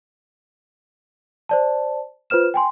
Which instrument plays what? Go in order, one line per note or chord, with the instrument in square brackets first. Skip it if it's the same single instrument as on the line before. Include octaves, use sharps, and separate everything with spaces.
[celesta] C5 D5 A5
F4 B4 C5 F6 E7
G5 G#5 C6